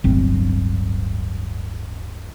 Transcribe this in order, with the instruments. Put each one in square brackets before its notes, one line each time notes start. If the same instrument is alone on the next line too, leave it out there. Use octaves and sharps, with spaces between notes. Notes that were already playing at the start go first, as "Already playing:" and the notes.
[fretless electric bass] D1 G1 C4